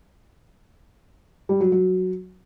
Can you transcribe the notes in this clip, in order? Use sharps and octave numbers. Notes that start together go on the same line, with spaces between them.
G3
F#3
F#3